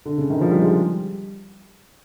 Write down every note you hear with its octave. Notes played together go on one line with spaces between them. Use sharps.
D3
C#3
D#3
F3
G3
G#3
G3